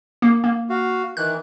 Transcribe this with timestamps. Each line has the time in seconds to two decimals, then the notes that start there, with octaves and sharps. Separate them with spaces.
0.22 A#3
0.44 A#3
0.70 F#4 F5
1.17 D#3 E3 F#6